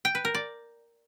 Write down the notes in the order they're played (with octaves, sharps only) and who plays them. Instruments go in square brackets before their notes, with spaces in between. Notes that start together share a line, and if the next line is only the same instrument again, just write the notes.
[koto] G5
B4
A#4
D5